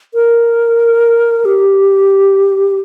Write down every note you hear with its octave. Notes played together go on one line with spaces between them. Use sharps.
A#4
G4